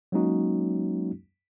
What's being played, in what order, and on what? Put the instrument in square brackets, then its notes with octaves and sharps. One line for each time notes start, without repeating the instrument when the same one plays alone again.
[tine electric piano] F#3 G#3 A#3 C#4 D#4 F#4